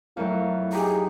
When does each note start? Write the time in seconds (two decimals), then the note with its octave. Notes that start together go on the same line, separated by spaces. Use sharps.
0.17 F2 F#3 A3 E4 A#4 F5
0.73 D#4 G4 G#4 A#5